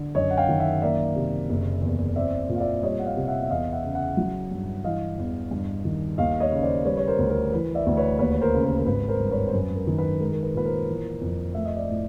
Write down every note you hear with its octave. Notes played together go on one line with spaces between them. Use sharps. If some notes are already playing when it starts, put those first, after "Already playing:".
Already playing: D3
F#2 C#5 D#5
F#5
F5 G5
D#3
E5 F#5
A#3 D5 E5
C3
F#1
E2
C4 D5 E5
A#2
F5
D5 E5
G3 C#5 D#5
F#5
D#5 F5
C3
F5
E5 F#5
E5
E2 D#5 F5
E5 F#5
C#3
E5 F#5
F#3
G2
E3 D#5 F5
E2
G2
D#3
D#2 D#5 F5
C#5 D#5
C#3
C5 D5
G3 B4 C#5
C#5
A#4 C5
D2
A#4
E3 B4
D5 E5
D2
B4 C#5
D#2 B4 C#5
C#5
A#4 C5
C#3
A#4
A#4
G#1 B4
A#4 C5
G2
B4 C#5
C5
F#2 B4
A#4
D#3
B4
G#3 A#4
A#4
B4
A#2 B4
A#4 C5
E3
F2
A3 E5
D#5
D5 E5
A2